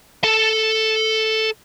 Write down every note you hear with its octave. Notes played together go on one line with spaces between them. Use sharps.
A4 A5